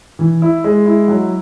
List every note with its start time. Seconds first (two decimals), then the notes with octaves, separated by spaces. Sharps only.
0.19 E3
0.42 E4
0.64 G#3
0.85 E4
1.08 F#3